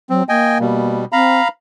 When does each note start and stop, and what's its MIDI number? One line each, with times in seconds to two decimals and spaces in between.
0.10 0.22 54
0.10 0.23 60
0.29 0.97 58
0.29 0.58 75
0.29 0.58 79
0.29 0.58 80
0.60 1.05 47
0.60 1.05 55
1.12 1.41 60
1.12 1.48 77
1.12 1.48 82
1.12 1.48 83